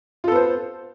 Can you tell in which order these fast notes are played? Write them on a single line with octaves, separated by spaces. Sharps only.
F4 A4 B3 C5